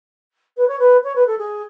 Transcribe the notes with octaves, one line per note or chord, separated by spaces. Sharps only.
B4
C#5
B4
C#5
B4
A4
G#4